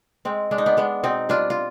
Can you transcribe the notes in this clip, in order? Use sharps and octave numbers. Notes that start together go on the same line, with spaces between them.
G#3 C4
G#3 D4
D#4
B3 D4
G#3 B3 D4
B2 C4 D#4
G3 D4 F4
F4